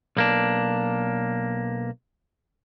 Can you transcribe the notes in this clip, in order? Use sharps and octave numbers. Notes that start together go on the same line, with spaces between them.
B1 A#3 D4